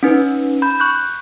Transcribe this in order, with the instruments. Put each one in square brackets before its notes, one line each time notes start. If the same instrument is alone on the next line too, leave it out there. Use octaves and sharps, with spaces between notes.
[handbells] C#4 D#4 B4
B5 G6
C#6 F#6 G6